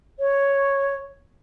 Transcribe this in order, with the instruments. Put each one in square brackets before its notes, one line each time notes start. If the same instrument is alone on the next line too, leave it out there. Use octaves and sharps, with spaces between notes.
[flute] C#5